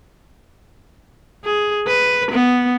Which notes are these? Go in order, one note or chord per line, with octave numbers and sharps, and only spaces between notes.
G#4
B4
B3